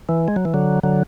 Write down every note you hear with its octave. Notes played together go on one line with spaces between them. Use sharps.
E3
G#3
F#3
E3
D3 F#3
D3 F#3